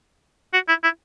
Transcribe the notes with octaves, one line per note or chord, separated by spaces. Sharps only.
F#4
E4
E4